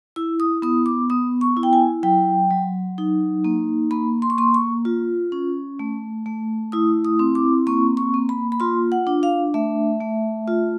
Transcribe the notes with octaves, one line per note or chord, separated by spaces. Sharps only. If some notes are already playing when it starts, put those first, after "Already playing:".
E4 E6
D#6
B3 D#6
D6
B3 D#6
C#6
E4
G5
G#5
F#3 G5
F#3
D#4
A#3
A#3 B5
C6
C#6
A#3 C6
C#6
F4
C#4
A3
A3
E4 D#6
D#6
C4
D6
A#3 C#6
C#6
A#3
B5
B5
F4 C6
F#5
D4
F5
A3 E5
A3
F4